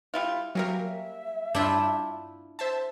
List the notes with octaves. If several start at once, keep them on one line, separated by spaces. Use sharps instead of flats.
G3 E4 F4
F#3 G3 A#3 C#4 A#4 E5
G2 D4 E4 F4 G6 E7
C5 E5 A5